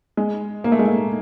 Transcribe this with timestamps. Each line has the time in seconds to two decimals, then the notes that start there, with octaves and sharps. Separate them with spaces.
0.17 G#3
0.64 A#3
0.72 A3
0.79 G#3
0.86 A3